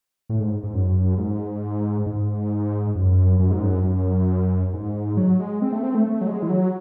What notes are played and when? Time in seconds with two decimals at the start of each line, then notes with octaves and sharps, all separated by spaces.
0.29 A2
0.40 G#2
0.63 G#2
0.74 F#2
1.18 G#2
2.06 G#2
2.96 F#2
3.39 F#2
3.51 G#2
3.63 F#2
3.84 F#2
4.73 G#2
5.17 F#3
5.40 G#3
5.62 C4
5.72 A3
5.83 C4
5.95 A3
6.06 A3
6.21 F#3
6.27 G#3
6.43 E3
6.49 F#3